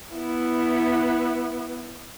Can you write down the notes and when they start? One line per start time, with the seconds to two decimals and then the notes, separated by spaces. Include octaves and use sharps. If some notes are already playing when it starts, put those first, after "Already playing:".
0.14 B3 E4